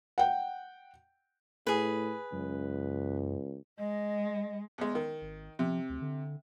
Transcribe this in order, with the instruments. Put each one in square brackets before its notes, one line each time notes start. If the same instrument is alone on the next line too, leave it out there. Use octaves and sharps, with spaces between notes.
[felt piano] F#5 G5
[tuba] A2 [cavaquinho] G#4 B4
[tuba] C#2 [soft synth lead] F#2
[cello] G#3 [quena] D#5
[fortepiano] E2 G#3
D#3
[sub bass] G#1
[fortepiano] C3 [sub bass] F3
[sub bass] D2
D3